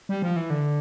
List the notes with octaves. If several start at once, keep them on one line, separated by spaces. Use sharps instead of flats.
G3
F3
E3
D3